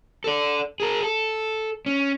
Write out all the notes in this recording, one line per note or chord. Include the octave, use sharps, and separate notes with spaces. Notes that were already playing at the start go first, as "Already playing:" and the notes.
A4 D5
G#4 A#4
A4
C#4